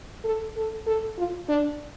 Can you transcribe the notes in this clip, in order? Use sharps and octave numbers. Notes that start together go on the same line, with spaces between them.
A4
A4
A4
F4
D4